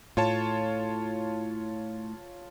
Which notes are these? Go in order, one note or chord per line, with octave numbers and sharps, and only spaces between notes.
A2 F4 C#5 A5